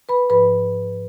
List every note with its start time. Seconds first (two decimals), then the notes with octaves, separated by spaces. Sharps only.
0.09 B4 B5
0.30 G#2 F3 B4 B5